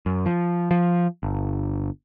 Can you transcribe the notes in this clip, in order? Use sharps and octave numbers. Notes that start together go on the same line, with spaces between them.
F#2
F3
F3
G1